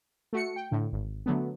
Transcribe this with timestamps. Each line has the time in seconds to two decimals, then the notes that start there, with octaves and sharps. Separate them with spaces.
0.33 A3 F#4 C#7
0.56 G5
0.71 A2 D3
0.92 G#1
1.26 D3 F#3 A3 B3